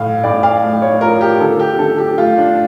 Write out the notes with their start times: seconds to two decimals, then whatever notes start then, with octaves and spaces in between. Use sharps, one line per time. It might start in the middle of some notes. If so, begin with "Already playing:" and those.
Already playing: A2 F5
0.23 A2 D5
0.43 F5
0.63 A3
0.82 C#5
1.01 F3 A#4
1.21 G4
1.40 D3 A4
1.59 G4
1.79 D3 A4
1.98 G4
2.18 A3 F4
2.38 D4